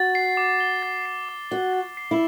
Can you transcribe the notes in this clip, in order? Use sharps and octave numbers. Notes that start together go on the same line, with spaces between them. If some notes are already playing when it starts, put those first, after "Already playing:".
Already playing: F#4 A6
C7
D6
G7
A6
C7
D6
F#4 G7
A6
C7
E4